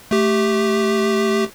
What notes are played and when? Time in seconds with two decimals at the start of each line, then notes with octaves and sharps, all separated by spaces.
0.11 A3 G4